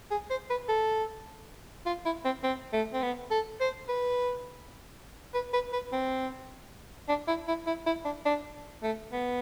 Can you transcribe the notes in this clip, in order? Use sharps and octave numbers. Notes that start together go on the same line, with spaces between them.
G#4
C5
B4
A4
F4
E4
C4
C4
A3
C4
B3
A4
C5
B4
B4
B4
B4
C4
D4
E4
E4
E4
E4
D4
D4
A3
B3